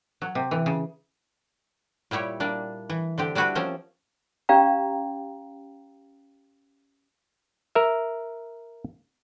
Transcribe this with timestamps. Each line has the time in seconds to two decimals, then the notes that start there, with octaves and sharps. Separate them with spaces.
0.22 F#3
0.35 C3
0.51 E3
0.66 C#3
2.11 A#2 G3 E4 G4 C#5
2.40 G3 A#3 D4
2.90 E3
3.18 D3 C4 G4
3.35 G3 D4 E4 F#4 G4 B4
3.55 F3 A#3 C4 C#4 C5
4.49 C#4 G4 D5 F5 G5 A#5
7.75 A#4 E5